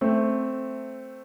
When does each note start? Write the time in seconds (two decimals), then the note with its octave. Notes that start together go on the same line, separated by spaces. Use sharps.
0.01 A3 C4